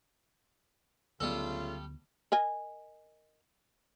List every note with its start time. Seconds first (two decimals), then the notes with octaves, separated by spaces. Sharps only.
1.20 D2 C#3 F#3 G3 A3 B3 F4 A4
2.32 A#4 D#5 G#5